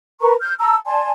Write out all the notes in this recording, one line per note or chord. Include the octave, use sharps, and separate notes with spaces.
A#4 B4 A#5 C#6
F6 G6
A5 A#5 E6
D5 G#5 A5 C6